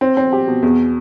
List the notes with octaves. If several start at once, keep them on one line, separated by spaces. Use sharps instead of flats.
C4
C4
G4
B2
E2